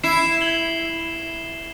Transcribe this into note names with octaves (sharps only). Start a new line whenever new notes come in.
E4 C7 E7
G#6 F#7 G7